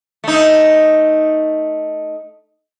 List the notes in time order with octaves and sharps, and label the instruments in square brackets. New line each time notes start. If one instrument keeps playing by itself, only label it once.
[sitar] A3 D#4